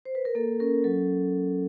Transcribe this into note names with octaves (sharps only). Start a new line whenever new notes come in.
C5
B4
A#4
A#3 A4
C#4 A#4
F#3 A4